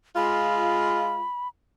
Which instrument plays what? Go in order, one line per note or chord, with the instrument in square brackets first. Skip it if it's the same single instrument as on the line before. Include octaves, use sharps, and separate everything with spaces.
[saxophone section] G#3 F4 [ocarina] B5